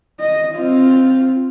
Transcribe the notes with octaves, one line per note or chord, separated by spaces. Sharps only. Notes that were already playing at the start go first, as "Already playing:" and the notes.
D#5
C4 F4